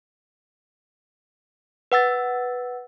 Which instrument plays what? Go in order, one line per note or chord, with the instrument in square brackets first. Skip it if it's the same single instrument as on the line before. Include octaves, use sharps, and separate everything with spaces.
[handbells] B4 F#5 E6 A6